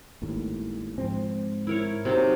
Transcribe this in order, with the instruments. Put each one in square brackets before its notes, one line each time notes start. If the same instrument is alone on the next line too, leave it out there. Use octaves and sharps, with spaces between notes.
[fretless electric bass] G#1 D#2 A2
G#2 F3 C4
[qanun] E4 A#4 C#5
C3 F#3 D#4